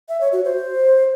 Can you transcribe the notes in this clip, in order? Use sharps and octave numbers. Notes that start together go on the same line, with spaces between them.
E5
C#5
F#4
C5